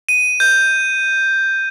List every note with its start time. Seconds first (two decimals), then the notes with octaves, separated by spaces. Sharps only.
0.09 D#7
0.40 G6